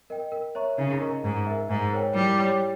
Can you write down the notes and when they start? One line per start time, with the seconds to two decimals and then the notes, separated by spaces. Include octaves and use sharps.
0.10 A#4 D#5 G5
0.32 A#4
0.55 C#5 E5 A#5 C#6
0.78 C#3 D#4
1.01 A#4 D#5 A#5 C#6
1.25 G#2 D#4
1.47 A#4 E5
1.69 G#2 D#4
1.93 A#4 C#5 G5
2.15 G3 E4
2.38 G4 C#5 G5